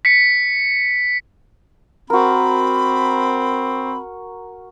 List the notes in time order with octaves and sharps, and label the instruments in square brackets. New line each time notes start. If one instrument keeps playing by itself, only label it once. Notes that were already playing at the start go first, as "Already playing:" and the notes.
[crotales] B6 C#7
[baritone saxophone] C4 [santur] F#4 A#4 [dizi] B5